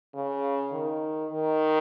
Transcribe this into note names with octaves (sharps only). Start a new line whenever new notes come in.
C#3
D#3
D#3